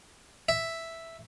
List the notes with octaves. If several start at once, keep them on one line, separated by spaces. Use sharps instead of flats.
E5